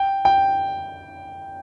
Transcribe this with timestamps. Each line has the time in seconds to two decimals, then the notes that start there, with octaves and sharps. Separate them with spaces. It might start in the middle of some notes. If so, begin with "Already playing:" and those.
Already playing: G5
0.25 G5